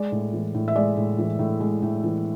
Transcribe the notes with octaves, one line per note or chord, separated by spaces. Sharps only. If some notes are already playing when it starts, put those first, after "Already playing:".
Already playing: G#3 D5
A2
E3
A2
E5
G#3 D5
A2
E3
A2
G#3
A2
E3